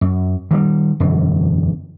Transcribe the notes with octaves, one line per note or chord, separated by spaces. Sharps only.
F#2
D#3 F3 G3
E1 F#2 D3